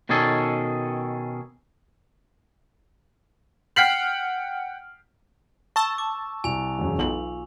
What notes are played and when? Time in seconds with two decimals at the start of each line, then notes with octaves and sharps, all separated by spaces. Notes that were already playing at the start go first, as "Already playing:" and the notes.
0.09 B2 D#3 C#4 G#4 A4
3.76 F#5 G5 F6 B6 C7 F#7
5.76 A5 C#6 E6
5.98 D6
6.44 C2 G#5 F7
6.79 E1 F#2 C#3
6.99 B1 F4 F#7